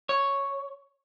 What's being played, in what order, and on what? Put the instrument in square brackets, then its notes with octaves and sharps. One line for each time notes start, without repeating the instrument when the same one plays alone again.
[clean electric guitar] C#5